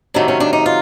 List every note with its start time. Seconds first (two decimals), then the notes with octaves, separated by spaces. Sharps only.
0.14 C3 D#3 F#3 A3 D4
0.28 C#4
0.40 D4
0.53 D#4
0.66 F4